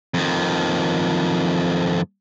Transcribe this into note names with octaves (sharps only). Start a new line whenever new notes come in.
F2 D#3